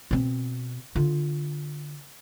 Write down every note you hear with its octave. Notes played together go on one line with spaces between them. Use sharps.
B2 C4
D3 F4